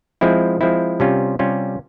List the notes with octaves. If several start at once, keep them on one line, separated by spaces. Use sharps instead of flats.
F3 G#3 C4 E4
F3 G#3 C4 E4
C3 G3 C#4 F4
C3 G3 C#4 F4